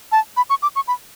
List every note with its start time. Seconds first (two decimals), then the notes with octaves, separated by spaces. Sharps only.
0.12 A5
0.37 B5
0.50 C#6
0.62 D6
0.76 C#6
0.88 B5